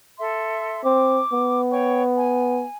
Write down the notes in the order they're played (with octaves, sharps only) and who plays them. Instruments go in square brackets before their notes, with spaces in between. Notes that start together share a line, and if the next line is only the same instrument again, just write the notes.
[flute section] A4 E5 C6
[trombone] C4 [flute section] D6
[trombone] B3
[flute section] C#5 G5 C#6
G#5